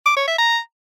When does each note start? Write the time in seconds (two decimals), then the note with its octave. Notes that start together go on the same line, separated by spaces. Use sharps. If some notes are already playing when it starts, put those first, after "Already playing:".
0.06 D6
0.17 C#5
0.27 E5
0.38 A#5